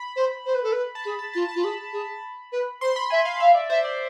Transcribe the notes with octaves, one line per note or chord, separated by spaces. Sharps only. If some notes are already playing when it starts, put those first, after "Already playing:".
Already playing: B5
C5
C5
B4
A4
B4
A5
G#4 B5
A5
F4 A5
A5
F4
G#4 B5
G#4
B4
C5 C6
B5
E5 G#5
F5
E5 F5
D5
C5 E5
D5